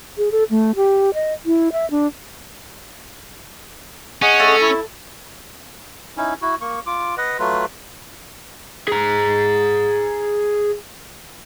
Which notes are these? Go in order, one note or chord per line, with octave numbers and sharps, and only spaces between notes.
G#4
A4
A3
G4
D#5
E4
E5
D4
C#4 G#4 D#5 F#5
A3
E4
C#4 D#4 E4
E4 F#4
A#3 C#6
F4 D6
B4 D#5 F#5
F#3 A3 F4 B4
G#4 A#5